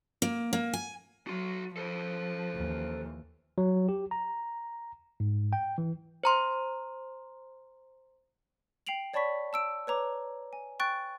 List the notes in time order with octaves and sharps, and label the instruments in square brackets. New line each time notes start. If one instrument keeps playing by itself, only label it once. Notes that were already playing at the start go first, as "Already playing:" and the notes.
[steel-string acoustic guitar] A#3
A#3
G#5
[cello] F#3 [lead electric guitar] F#4 C6
[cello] F3 [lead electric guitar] A4 C5
[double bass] D#2 E3
[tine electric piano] F#3
G4
A#5
G#2
G5
E3
[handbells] C5 A#5 C6
[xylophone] G5 C7 D7 F7 F#7
C#5 D5 A5 B5 C#6 B6
A5 E6 D7
B4 C#5 A#5 D6
G#5
G5 C#6 F#6 A6 D7